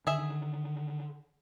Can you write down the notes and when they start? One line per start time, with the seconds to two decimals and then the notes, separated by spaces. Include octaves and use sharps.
0.07 D3 D#3 G#4 E5